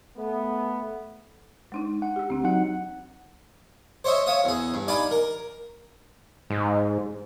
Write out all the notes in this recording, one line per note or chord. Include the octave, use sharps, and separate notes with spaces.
A3 B3
G#3 D4 D#4
F#5
G4 E6
D2 C4 D4
F#3 D#4 F#5
C5 C#5 D#5 E5
C#5 E5 F5 D#6
E2 G#4
G2
D#4 D5 F5 G#5 B5
A#4
G#2